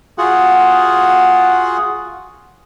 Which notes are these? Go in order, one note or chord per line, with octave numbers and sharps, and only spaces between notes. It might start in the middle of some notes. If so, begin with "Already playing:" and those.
F4 F#4 G#4 F#5